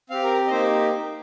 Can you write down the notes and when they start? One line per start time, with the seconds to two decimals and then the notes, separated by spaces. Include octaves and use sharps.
0.10 C4 G4 F5
0.23 A#4
0.47 D#5
0.50 A#3 D#4 G4 C5